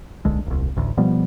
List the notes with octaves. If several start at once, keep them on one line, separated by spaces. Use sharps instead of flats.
D1 B1 D3 G#3
D#1 C2
A1 D2
B2 F3 G3 B3